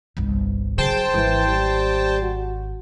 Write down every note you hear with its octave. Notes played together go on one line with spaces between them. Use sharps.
G1 C2
C#3 F#3 G#4 C5 G5 A5
G#1 E3
G3
F#4